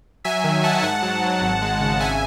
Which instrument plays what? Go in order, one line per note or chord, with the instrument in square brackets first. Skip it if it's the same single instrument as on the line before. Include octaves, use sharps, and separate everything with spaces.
[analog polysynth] F#3 E5 G#5
D#3
D#3 F#5 A5
G#2 F#5 A5
F#3
F#3
G#1
G#3
C#3
G#1 E5 G#5